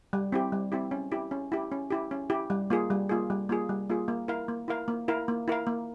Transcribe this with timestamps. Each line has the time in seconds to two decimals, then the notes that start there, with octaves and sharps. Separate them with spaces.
0.13 G3
0.32 C4 E4 G4
0.52 G3
0.72 C4 E4 G4
0.91 C#4
1.12 E4 G4
1.31 C#4
1.52 E4 G4
1.72 C#4
1.91 E4 G4
2.11 C#4
2.30 E4 G4
2.50 G3
2.70 A#3 F4 G#4
2.90 G3
3.09 A#3 F4 G#4
3.30 G3
3.49 A#3 F4 G#4
3.69 G3
3.89 A#3 F4 G#4
4.08 A#3
4.28 E4 A#4 F5
4.48 A#3
4.68 E4 A#4 F5
4.88 A#3
5.08 E4 A#4 F5
5.28 A#3
5.48 E4 A#4 F5
5.67 A#3